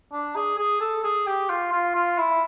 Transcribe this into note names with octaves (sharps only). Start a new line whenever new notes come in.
D4
G#4
G#4
A4
G#4
G4
F4
F4
F4
E4